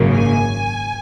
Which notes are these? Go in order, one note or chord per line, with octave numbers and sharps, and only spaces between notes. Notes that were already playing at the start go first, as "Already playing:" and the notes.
Already playing: G#1 F#2 C#3 A#3
G#5